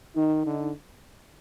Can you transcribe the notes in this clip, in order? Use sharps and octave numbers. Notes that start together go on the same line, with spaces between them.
D#3 D#4
D3